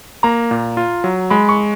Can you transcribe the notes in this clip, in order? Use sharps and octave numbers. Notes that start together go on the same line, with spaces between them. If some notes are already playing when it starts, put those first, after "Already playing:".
A#3 A#5
A#2
F4
F#3
G#3 B5
C#6